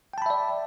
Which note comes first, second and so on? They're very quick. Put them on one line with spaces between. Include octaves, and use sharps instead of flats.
G5 A5 B5 E5 D5